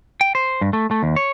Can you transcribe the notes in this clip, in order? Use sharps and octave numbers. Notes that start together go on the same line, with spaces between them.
G5
C5
G2
A3
A3
D#2
C#5